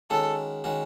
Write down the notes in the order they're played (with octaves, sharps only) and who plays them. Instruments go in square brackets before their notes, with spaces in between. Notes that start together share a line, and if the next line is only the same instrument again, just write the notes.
[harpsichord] D#3 G#3 C#4 F#4 [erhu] A4
[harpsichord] D#3 G#3 C#4 F#4